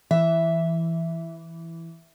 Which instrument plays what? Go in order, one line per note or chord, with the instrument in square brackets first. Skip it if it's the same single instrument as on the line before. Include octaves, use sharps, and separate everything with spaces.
[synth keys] E3 [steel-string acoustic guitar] E5